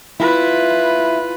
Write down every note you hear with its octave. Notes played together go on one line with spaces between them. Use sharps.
E4 F4 B4